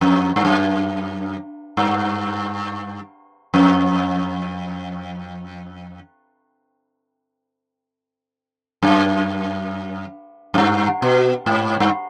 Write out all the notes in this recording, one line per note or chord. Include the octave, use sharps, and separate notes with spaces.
F2
G2
F#2
G2
F2
F#2
F#2
G2
B2
G#2
G2